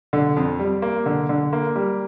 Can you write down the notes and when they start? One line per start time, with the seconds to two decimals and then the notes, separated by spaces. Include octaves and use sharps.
0.13 D3
0.37 F2
0.59 G3
0.82 A#3
1.06 D3
1.29 D3
1.53 A#3
1.76 G3